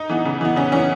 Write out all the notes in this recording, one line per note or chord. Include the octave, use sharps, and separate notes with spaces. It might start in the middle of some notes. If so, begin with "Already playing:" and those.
Already playing: D#4
E3 B3
C#3
E3 B3
C#3 C#4
E3 B3 C#4